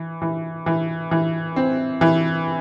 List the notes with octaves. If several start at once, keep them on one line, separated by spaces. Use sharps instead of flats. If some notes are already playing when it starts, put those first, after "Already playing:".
Already playing: E3
E3
E3
E3
C4
E3